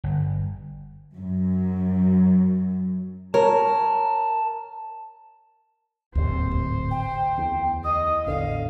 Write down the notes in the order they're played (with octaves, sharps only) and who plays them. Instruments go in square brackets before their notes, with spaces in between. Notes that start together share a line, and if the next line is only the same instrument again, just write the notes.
[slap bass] G1
[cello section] F#2 F#3
[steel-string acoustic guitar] A#4 [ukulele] C#5 [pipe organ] A5
[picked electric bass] D1 G#1 C3 [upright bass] D#2 [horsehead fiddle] C5
[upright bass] D2
[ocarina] G5
[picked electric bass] E2
[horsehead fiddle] D#5 [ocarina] D#6
[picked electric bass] A1 E2 D3 [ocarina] D#5 [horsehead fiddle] F5